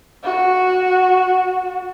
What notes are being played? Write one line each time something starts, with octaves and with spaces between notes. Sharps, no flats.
F#4